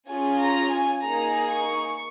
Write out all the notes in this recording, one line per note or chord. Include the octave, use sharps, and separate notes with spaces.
C#4 F4 G#4 G#5
A#5
G#5
A#3 D#4 G#4 A#5
C#6